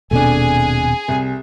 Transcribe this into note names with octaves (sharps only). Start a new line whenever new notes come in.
D#1 B2 A3 C4 D4 G#4 G#5
C2